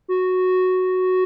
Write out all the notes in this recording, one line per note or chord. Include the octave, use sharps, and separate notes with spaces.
F#4